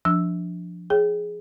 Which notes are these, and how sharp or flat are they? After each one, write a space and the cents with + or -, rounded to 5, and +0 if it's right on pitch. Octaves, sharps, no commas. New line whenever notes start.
F3 +0 D4 +0 E6 +0
G#4 +10 C#5 +0 G5 +0